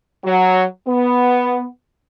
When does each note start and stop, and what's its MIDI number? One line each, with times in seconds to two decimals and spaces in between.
0.25 0.63 54
0.87 1.64 59